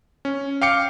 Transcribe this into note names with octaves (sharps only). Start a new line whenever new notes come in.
C#4
F5 G5 D6 C#7